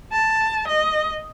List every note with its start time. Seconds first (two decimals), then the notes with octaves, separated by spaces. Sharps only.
0.12 A5
0.68 D#5